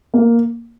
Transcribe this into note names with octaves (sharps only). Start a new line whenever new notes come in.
A#3